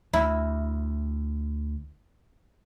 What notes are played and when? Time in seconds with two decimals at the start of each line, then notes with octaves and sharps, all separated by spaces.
0.13 D2 E4